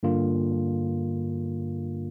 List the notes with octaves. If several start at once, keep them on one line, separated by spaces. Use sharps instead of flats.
G2 D3 A#3 F4